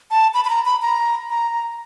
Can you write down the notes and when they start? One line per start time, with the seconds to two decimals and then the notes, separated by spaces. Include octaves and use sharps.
0.11 A5
0.34 B5
0.45 B5
0.50 A#5
0.65 B5
0.82 A#5
1.30 A#5